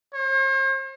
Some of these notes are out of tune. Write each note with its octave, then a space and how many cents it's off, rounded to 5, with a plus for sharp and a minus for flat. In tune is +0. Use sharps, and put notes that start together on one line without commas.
C5 +45